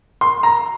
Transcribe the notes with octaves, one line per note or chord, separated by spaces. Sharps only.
C6
A#5